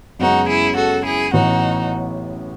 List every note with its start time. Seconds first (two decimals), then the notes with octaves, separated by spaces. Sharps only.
0.19 F#2 C#3 G#3 B3 D#4 F#4
0.48 E4 G#4
0.76 F#4 A4
1.04 E4 G#4
1.33 A1 A2 E3 B3 D#4 F#4